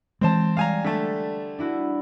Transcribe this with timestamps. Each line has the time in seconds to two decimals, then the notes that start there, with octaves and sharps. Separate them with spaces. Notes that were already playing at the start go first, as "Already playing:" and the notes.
0.21 E3 G#3 C4 C5 A5
0.57 G3 F5 G#5 A#5
0.84 D3 A3 A5 B6
1.58 D4 E4 F#4